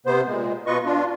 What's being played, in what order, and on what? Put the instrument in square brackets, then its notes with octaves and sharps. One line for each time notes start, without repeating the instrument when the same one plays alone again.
[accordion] C3 B3 C5
A#2 G#3
B2 F4 B4 D#5 C#6
D4 F4